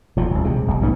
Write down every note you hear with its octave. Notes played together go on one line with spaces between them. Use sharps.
E1 D2 F3
D#1 C2
C3 G#3
D1 B1
D2 G#2 A#3 B3